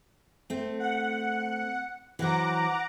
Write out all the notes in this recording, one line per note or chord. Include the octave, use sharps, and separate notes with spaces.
A3 C4
F#5
E3 F#3 C5 F#5 A#5 D6